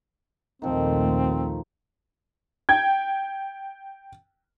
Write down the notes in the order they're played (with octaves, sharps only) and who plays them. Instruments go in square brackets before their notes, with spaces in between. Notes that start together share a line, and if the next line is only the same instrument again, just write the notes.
[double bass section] A#1 D#2 A3 [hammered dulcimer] D#3 F3 [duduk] C4
[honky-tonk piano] G5 G#6